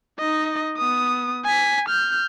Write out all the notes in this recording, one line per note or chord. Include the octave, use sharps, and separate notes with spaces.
D#4 D#5
B3 D#6
G#5 B6
F6 G6